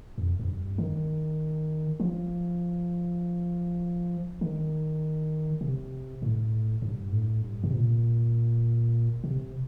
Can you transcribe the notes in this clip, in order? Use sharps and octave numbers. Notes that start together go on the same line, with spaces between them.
F2
F2
G2
D#3
F3
D#3
C3
A2
G2
A2
G2
C3
A#2
C3